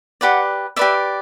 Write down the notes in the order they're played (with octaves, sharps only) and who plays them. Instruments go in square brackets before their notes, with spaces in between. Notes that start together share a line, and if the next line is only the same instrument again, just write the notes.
[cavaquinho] G4 B4 D5 F#5
G4 B4 D5 E5